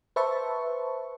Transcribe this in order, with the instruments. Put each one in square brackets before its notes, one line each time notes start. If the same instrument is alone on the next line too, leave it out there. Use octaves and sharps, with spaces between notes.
[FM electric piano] B4 C5 E5 A5 C#6